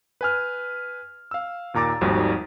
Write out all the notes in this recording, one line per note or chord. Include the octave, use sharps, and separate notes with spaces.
B4 G#5 F6
F5 E6
D#2 A#2 A#5 D6 A6
G#1 D#2 F3 G3 F#4 A#5